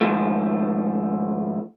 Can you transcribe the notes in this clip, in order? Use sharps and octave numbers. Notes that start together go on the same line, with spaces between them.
G#2 D#3 F3 A3